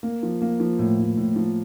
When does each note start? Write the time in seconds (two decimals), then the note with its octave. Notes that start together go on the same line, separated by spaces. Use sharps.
0.03 A#3
0.23 F3
0.42 A#3
0.60 F3
0.79 A2
0.99 A2
1.17 A2
1.36 F3